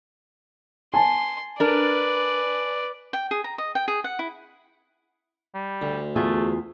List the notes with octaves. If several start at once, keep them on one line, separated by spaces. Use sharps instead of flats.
G#5 A5 C6
D4 A#4 B4 D5
G5
G#4
A#5
D#5
G5
G#4
F#5
E4
G3
D2
E2 A3 F4 G#4